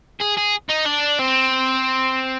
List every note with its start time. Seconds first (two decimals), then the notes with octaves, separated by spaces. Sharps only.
0.20 G#4
0.37 G#4
0.70 D#4
0.86 D4
1.19 C4